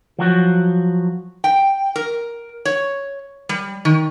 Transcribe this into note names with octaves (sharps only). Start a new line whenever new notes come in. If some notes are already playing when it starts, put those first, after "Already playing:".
F3 F#3 F#4
G5
A#4
C#5
G3
D#3